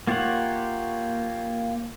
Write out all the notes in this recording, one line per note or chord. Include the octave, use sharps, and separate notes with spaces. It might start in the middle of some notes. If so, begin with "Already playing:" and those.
A#3 F4 G4 C#5 F#5